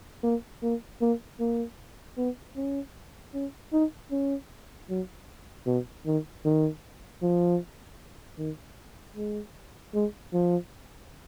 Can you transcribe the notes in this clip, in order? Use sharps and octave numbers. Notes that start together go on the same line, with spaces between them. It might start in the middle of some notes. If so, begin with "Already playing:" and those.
A#3
A#3
A#3
A#3
B3
C#4
C#4
D#4
C#4
F#3
B2
D#3
D#3
F3
D#3
G#3
G#3
F3